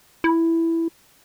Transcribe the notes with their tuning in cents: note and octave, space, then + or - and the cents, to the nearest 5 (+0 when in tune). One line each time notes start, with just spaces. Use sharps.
E4 +5